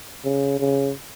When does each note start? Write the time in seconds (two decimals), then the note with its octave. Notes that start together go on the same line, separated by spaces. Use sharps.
0.24 C#3
0.59 C#3